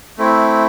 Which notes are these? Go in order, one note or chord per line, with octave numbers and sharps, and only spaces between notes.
A3 C4 E4